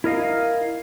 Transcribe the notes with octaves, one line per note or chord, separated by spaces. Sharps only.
E4 A#4 D#5 F5